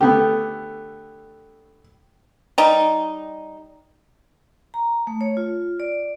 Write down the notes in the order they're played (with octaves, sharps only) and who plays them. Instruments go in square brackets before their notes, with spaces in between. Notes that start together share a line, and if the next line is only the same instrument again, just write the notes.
[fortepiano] D3 A3 B3 [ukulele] G4
[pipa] G3 D#4
[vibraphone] A#5
A3
C#5
F4
D5